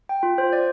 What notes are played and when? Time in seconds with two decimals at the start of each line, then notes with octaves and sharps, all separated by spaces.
0.09 G5
0.23 F4
0.38 C5
0.53 D5